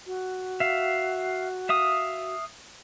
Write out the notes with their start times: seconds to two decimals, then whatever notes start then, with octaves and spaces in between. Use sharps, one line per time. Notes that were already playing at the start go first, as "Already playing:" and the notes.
0.07 F#4
0.60 E5 F5
1.69 E5 F5 D#6